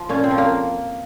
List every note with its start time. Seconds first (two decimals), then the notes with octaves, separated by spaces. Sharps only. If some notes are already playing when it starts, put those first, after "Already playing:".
Already playing: F3
0.09 A#2 C#4
0.24 C4
0.30 F3
0.38 A#3